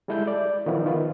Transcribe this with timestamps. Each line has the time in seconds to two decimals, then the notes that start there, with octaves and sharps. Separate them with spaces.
0.08 G3 G#3 E4 A4 G6
0.27 D5
0.66 D#3 F3 B3 E4
0.85 D#3 F4 B4